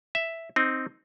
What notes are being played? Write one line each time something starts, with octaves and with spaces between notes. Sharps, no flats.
E5
C4 D#4